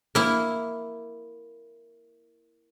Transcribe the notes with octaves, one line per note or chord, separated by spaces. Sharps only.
A#3 E4